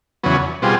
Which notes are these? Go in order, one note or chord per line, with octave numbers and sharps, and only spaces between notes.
E2 C#3 F#3 B3
B2 G3 C4 F4 G#4